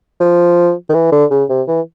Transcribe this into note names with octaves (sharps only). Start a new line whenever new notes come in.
F3
D#3
E3
D3
C#3
C3
E3